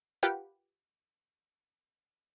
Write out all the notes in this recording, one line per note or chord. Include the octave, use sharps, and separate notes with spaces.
F4 G4 A#4 B4 F#5 G5